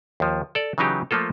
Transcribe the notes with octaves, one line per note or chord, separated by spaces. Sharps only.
D#2 F3
A4 D5
C#3 E3 F#3 D#4 G4
F3 A3 A#3 F4 A4